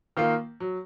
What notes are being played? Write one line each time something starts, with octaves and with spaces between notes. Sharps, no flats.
D#3 A#3 F4
F#3